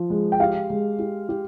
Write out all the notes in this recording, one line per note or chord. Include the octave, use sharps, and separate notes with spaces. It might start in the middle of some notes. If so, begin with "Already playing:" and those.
Already playing: F3
G#3
G5
G4 F5
G#3
G4
G4